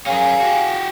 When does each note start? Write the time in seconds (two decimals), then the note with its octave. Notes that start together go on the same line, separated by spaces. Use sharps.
0.07 C#4 G#4 A#4 F5
0.40 F#4 G4